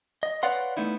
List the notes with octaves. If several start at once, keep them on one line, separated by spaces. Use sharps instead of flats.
D#5
B4 C#5 D5 F5 F#5 C6
A3 B3 D#4 E4